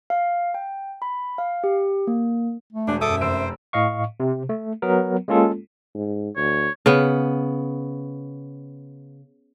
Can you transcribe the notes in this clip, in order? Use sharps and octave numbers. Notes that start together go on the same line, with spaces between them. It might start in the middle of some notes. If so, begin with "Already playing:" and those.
F5
G5
B5
F5
G4
A#3
A3
E1 D4
F#2 A4 E5 D6 D#6
F1 C5 E6 D7
A2 D#5 F5 C#6
C3
A3
F#3 B3 A#4
G#3 A#3 C#4 F4 A4
G#2
D2 C#5
C#3 B3